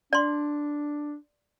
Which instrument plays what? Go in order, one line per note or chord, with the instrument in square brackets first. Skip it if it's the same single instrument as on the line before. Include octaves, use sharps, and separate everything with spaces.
[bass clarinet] D4 [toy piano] D5 C6